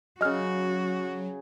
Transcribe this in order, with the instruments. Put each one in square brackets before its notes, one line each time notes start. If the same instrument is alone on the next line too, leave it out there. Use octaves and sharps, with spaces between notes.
[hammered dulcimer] C#3 G#4 [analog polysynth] F#3 [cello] F#4 [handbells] D#5 F6